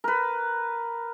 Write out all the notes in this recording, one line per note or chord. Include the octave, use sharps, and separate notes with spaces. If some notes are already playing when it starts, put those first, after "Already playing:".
A#4 B4